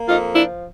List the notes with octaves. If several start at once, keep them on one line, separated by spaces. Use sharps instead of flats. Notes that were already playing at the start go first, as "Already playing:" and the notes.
Already playing: A#3
F2 D#4 F4
F3 D4 E4